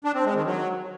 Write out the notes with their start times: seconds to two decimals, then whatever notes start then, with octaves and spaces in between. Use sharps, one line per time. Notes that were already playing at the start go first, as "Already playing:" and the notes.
0.04 D4
0.15 C4
0.25 G#3
0.35 D#3
0.45 F#3